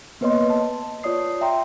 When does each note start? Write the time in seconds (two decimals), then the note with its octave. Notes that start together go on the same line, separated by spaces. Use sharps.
0.21 A#3 B3 B4 C#5 D#5 C6
0.50 A5
1.03 F4 C#5 D5 D#6 C7
1.41 E5 G5 A#5 C6